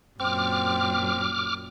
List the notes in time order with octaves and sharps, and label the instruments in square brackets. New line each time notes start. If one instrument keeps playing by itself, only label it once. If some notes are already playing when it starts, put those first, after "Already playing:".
[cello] F#2 A#2 [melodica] C4 [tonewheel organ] D6 F6